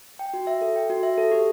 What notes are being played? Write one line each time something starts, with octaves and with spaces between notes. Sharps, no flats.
G5
F#4
E5
A4
G5
F#4
E5
A4
G4